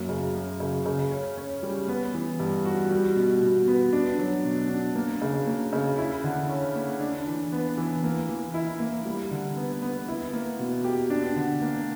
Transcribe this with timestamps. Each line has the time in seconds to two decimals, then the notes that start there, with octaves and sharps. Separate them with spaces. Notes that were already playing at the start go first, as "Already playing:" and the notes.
Already playing: F#2 A#3
0.09 C#3
0.35 F#2
0.60 C#3
0.86 C#3
1.11 C#4
1.38 C#4
1.63 G3
1.88 B3
2.14 E3
2.40 G2
2.65 F#4
2.91 G3
3.16 B2
3.42 B2
3.68 B3
3.93 D4
4.18 F#3
4.45 B2
4.70 D4
4.95 A#3
5.21 C#3
5.47 A#3
5.73 C#3
5.98 E4
6.24 D3
6.49 C#4
6.75 A#3
7.01 D4
7.27 E3
7.52 B3
7.78 E3
8.03 A#3
8.29 E3
8.54 E4
8.80 A#3
9.05 G3
9.31 D3
9.57 B3
9.82 B3
10.08 E4
10.33 A#3
10.59 B2
10.84 G4
11.10 D4
11.36 D3
11.62 A#3